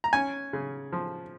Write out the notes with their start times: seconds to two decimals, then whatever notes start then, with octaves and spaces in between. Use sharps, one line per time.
0.04 A#5
0.13 C#4 G#5
0.53 C#3
0.93 F3